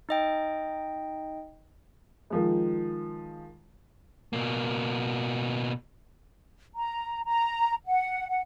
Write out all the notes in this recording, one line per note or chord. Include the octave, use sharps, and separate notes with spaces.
D#4 D#5 G5
D#3 F3 G#3
B2 A#3
A#5
A#5
F#5
F#5